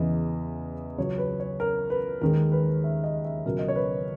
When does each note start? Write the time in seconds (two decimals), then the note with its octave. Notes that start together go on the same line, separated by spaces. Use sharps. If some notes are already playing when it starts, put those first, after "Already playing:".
Already playing: E2 C#3 E3 D#5
0.98 C#2 C#3 F#3 C#5
1.18 B4
1.40 C#5
1.60 A#4
1.90 B4
2.21 D#2 D#3 G#3 A#4
2.52 B4
2.84 E5
3.04 D#5
3.25 E5
3.45 C#2 B2 F#3 A#4
3.59 D#5
3.68 C#5
3.76 B4